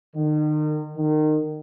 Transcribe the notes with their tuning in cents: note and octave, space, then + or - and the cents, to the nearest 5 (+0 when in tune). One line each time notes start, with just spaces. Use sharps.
D#3 -35
D#3 -25